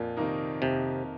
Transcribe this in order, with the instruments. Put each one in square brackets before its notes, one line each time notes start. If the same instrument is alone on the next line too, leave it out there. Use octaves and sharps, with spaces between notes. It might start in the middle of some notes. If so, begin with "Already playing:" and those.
Already playing: [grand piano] F2 [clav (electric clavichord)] A#2
[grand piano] C3 D#3 A#3 D#4
[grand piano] F2 [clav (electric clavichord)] C3